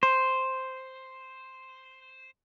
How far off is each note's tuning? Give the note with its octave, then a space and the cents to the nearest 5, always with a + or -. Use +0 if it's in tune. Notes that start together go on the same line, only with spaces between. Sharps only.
C5 +0